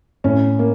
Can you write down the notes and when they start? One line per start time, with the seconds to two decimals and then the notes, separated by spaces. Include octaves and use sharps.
0.24 A2 C#4
0.59 A#3